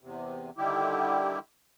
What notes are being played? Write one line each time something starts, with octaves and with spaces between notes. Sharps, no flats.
E2 C3
D3 D#3 G3 E4 G4